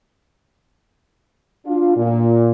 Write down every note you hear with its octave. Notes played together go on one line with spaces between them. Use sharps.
D4 F4
A#2